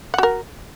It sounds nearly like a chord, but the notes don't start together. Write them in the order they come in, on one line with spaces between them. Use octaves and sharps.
F#5 F#4 A#4